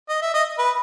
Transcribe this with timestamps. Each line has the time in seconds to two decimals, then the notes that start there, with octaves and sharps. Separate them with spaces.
0.09 D#5
0.22 E5
0.34 D#5
0.58 B4